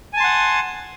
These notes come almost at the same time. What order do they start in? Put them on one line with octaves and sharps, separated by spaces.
G#5 A5 C6 F#5